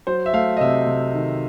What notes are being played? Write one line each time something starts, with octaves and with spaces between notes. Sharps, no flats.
F#3 C5
E5
A3 F5
D#5
C3 E5
C3
D#3